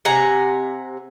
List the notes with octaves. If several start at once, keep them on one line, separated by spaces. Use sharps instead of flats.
C3 F#5 G#5 A#5